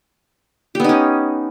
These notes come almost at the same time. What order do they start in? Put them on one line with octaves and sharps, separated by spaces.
G4 B3 D#4 C#4